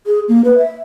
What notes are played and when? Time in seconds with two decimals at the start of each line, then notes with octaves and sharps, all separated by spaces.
0.06 G#4
0.28 A#3
0.45 B4
0.58 E5